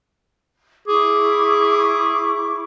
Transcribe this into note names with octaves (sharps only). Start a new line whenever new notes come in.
E4 G#4 C#6 D6